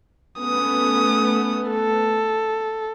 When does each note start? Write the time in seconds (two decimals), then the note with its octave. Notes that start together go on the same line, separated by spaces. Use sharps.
0.40 A3 B3 C#4 D#6
1.71 A4